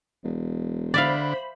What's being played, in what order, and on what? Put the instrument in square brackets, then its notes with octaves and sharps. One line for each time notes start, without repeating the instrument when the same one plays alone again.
[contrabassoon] E1
[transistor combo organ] D3 [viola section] C5 B5 [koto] D5 E5 F5